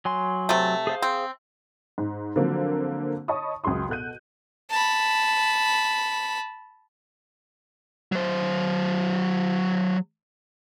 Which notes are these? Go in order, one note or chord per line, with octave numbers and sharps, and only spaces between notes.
F#3 G#5 C6
C3 A3
G#4 C5 F5
C4
G#2
D3 F3 F#3 A#3 C4
C#5 D#5 A5 B5 C#6 D#6
C#2 F#2 G#4 C6 D#6
B2 F#4 A4 F#6 G6 D#7
A5 B5
F#3 C5